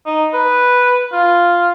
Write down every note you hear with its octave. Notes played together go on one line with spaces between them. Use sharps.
D#4
B4
F4